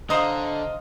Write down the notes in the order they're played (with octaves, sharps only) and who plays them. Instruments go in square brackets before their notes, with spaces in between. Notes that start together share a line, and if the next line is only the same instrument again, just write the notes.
[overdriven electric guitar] D3 [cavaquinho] C5 A#5 D#6 [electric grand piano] D#5 F5